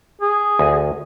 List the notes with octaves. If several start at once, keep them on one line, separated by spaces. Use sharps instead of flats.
G#4
D2 G#5